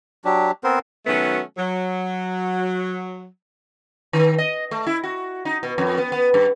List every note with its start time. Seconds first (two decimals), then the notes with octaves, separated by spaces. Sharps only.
0.25 F#3 D4 G4
0.64 B3 C4 A#4 C5
1.06 D#3 F#3 A3 B3 C#4 F#4
1.57 F#3
4.13 D#3
4.38 D#5
4.71 A3
4.87 E4
5.04 F#4
5.45 D#4
5.63 B2
5.78 F2
5.98 B3
6.12 B3
6.34 G2